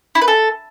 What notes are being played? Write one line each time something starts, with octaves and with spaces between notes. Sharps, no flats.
E4
B4
A4